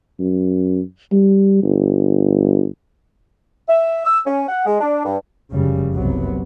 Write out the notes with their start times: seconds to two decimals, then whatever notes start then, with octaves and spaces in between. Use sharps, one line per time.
0.19 F#2
1.12 G3
1.63 G1
3.68 E5
4.05 E6
4.26 C#4
4.48 F#5
4.66 G#3
4.80 D4
5.05 G2
5.52 F1 F#2 C#3 G3
5.94 F#1 C2 C3 F#3 B3